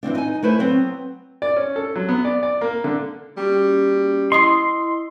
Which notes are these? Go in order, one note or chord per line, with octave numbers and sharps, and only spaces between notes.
E3 F3 C4 D4
D#4 G#5
A3 E4 B4 C5
F#3 B3 C4
D5
C#4
A4
F#3
B3
D5
D5
A#3
D3
G3 A#3 C#4 F#4
E4 D#5 C6 D#6 C7